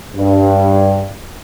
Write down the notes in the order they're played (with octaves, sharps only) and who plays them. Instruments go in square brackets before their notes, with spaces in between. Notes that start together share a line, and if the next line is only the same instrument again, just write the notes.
[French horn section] G2